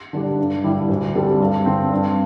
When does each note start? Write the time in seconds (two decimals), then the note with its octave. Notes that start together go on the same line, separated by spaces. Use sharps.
0.13 D3 G3 D4
0.39 G2
0.64 D3 G3 E4 G4
0.89 D2
1.14 D3 G3 C4 A4
1.40 G2
1.66 D3 C4
1.92 G2